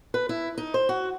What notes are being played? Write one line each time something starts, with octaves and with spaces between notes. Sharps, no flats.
B4
E4
D#4
C5
F#4